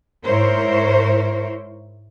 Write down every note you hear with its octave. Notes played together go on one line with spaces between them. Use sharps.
G#2 E4 A#4 C5 C#5